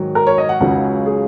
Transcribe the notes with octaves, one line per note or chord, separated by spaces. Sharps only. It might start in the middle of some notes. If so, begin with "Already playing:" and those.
Already playing: G#2 D#3 F#3
A#4
C#5
D#5
F#5
C#2 C#3 F#3 F#5
G#4